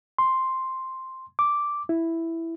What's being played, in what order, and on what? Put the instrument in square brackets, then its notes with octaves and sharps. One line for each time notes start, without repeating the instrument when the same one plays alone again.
[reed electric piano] C6
D6
E4